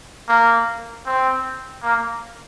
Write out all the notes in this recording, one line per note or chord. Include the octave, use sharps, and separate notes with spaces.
A#3
C4
A#3